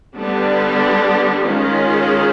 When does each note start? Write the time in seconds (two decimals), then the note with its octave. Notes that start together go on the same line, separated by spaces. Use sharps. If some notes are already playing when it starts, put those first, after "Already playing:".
0.15 D3 G3 B3 D4
1.45 D#3 G#3 C#4 F4 G#4